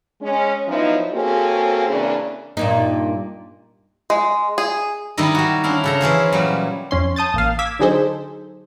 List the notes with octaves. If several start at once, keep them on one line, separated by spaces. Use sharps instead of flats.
G#3 C#4
F3 F#3 B3 D#4 E4 D#5
A#3 C4 C#4 F#4 G#4 A4
C#3 E3 A#3 C4 D4
G2 A#2 D#4
G#3
G#4
D#3 G3 D#4 E4 D#5
G3 F#4
C#4 D4 E4 F5
C#3 A4 A#5
E3 C#4 G#4 C5
A#2 E3 F#3 G3
F2 C#4 C6
A5 D#6 G6 A6
A1 A#3 F5
D6 E6 G#6 B6
D3 F#3 D#4 G#4 A4 C5